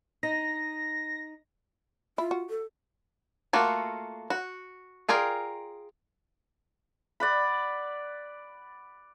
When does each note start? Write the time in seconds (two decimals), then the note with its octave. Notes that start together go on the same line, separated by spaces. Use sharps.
0.23 D#4 A#6
2.18 E4 F4
2.31 F#4
2.50 A4
3.53 A3 A#3 F4 F#4
4.30 F#4
5.09 F4 G#4 A#4 D5 G5
7.20 D5 F#5 B5